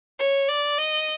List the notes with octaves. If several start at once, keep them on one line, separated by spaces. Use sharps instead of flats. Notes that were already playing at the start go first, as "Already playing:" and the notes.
C#5
D5
D#5